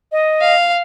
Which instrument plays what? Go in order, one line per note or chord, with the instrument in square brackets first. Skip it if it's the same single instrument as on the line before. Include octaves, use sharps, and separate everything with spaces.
[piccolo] D#5
[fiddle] F5